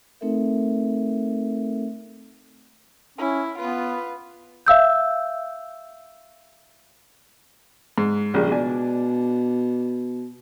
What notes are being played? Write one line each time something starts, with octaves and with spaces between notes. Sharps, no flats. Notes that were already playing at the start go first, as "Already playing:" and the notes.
A3 C4 D#4 A4 A#4 E5
C#4 E4
B3 F4 B4
E5 F5 E6 G6
G#2
A#1 C#3 G3
B2 D4 G#5